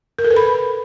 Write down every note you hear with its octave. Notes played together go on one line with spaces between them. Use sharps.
A#4
A4
B4
B5